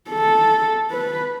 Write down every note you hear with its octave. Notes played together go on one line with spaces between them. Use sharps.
A4
B4